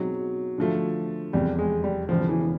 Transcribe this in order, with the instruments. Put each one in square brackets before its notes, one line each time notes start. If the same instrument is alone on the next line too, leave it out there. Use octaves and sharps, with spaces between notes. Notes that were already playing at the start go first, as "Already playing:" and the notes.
Already playing: [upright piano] B2 G#3 C4 D#4 [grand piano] F#3
[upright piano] D3 F3 A3
[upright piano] F1 E2 C3 [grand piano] G3
[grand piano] G#3
G3
[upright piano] E1 E2 C#3 [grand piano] F3
[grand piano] E3